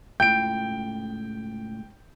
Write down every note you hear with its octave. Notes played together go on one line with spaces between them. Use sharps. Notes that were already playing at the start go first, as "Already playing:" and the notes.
C#2 A2 G5 G6 D7